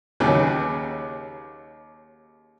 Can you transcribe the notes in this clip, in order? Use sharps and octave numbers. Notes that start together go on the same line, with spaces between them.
D#2 C#3 F#3 B4 G5 G#5